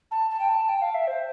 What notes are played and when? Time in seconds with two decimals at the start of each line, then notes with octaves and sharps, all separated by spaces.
0.11 A5
0.31 A5
0.39 G5
0.49 A5
0.69 G5
0.82 F5
0.94 E5
1.07 C5